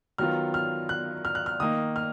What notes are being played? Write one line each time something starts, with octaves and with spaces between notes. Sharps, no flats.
D#3 F#3 B3 F4 F6
F6
F#6
F6
F#6
F6
D#3 A#3 D#4 D#6
F6